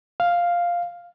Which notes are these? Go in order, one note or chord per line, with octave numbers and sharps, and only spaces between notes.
F5